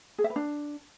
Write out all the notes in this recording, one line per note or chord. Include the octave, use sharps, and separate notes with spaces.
G#4
E5
B4
D4